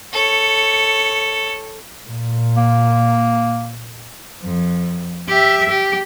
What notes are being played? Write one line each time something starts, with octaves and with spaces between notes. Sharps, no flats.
A4 C#5
A#2
A#3
F2
G4 E5
G4